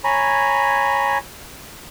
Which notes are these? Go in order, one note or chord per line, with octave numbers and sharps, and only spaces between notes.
C#5 G#5 A#5 B5